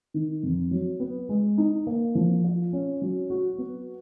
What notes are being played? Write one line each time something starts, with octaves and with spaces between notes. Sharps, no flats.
D#3
F2
F#3
B3
G#3
D#4
A#3
F3
F4
C#4
F#3
F#4
B3